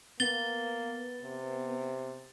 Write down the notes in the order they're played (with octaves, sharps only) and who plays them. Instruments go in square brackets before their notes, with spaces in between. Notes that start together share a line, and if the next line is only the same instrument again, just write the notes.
[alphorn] A#3 [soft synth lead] B3 [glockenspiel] A6 G7
[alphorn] C3